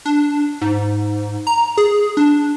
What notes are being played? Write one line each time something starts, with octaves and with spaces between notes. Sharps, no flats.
D4
G#2
A#5
G#4
D4